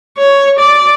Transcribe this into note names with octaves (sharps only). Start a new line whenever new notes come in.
C#5
D5